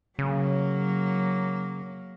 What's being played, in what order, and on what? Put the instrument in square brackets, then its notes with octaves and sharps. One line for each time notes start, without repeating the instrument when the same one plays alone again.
[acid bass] C#3 [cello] F#3 A#3